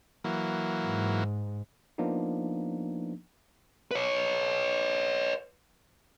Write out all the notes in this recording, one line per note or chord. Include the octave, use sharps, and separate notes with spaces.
E3 F#3 A#3
G#2
F3 A#3 B3 D4 D#4
B4 C#5